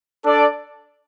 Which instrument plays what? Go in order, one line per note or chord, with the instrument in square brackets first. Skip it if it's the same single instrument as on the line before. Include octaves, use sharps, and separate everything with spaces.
[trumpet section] D4 A4 D5